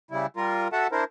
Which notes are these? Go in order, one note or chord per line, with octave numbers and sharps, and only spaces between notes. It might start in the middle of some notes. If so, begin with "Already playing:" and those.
C#3 G3 E4
G3 F4 A#4
F#4 A4 E5 F#5 A5
D4 E4 A#4 C5